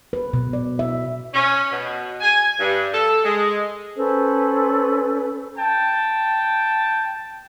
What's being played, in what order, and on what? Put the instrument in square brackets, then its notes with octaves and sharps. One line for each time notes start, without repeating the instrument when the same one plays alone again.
[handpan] B4
B2
D5
E5
[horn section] C#4
B2
G#5
G2
A4
G#3
[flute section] C#4 A4 B4 C5
[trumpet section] G5 A5